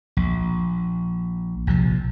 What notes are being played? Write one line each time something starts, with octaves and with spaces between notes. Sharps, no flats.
A#1
A#1 C3 F3